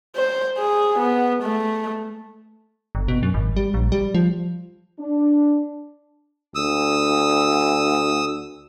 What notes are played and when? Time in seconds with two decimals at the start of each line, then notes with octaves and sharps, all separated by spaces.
0.16 C5
0.58 G#4
0.98 B3
1.43 A3
2.95 G1
3.08 B2
3.23 F#2
3.34 G#1
3.57 G3
3.74 A#1
3.92 G3
4.14 F3
4.99 D4
6.55 D2 D#6 E6